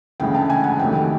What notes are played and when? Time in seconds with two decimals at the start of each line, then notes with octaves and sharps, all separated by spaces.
0.20 D2 C#3 E3 G#3 G5
0.35 A5
0.50 G#5
0.64 F#5
0.79 F2 C3 D#3 F#3 A3 G5